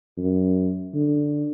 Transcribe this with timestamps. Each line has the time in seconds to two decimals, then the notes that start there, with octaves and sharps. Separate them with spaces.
0.18 F#2
0.94 D3